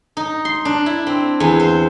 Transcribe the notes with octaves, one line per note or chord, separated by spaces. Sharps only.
D#4
C6
D4
E4
C4
E2
C5